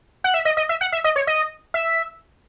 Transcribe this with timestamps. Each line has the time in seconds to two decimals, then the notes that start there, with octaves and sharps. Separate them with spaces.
0.24 F#5
0.34 E5
0.45 D#5
0.57 D#5
0.69 E5
0.81 F#5
0.92 E5
1.04 D#5
1.16 C#5
1.27 D#5
1.74 E5